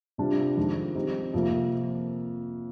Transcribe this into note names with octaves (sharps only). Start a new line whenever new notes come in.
C3 G3 D4 F4
F2 D#3 G#3
G3 C4 D#4 G4
F2 C3 F3 A#3